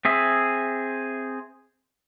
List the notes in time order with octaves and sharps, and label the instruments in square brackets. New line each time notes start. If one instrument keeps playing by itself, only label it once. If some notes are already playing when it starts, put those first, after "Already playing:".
[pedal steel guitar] C4 G#4 E5